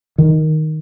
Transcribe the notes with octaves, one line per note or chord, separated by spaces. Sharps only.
D#3